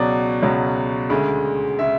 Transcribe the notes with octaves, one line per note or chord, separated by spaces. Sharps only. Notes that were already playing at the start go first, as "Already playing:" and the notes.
Already playing: C#2 B2 F#3 D5
C#2 B2 F#3
D2 C#3 G#3
C#3 G#3 E5